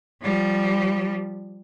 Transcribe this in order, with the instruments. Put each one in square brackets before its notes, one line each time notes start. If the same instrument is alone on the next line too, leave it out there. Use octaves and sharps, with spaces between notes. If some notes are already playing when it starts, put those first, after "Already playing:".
[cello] F3 G3